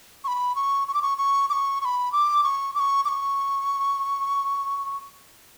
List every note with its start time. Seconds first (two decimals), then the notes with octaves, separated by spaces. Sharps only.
0.24 C#6
0.28 B5
0.55 C#6
0.88 C#6
0.94 D6
1.02 C#6
1.18 C#6
1.50 D6
1.53 C#6
1.81 C#6
1.85 B5
2.12 D6
2.44 C#6
2.75 D6
2.80 C#6
3.05 D6
3.08 C#6